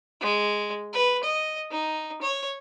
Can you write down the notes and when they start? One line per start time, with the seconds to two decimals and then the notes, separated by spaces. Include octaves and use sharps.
0.21 G#3
0.93 B4
1.23 D#5
1.71 D#4
2.22 C#5